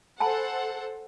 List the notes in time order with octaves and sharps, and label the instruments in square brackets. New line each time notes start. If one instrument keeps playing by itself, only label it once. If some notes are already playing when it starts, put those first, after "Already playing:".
[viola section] A4 [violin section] C5 F#5 [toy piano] G#5 A5 B5